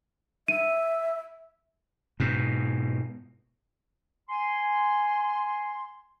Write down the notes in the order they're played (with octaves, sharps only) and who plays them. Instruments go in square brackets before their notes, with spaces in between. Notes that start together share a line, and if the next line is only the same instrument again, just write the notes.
[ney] E5 [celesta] D#7
[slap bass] G#2 B2
[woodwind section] G#5 C6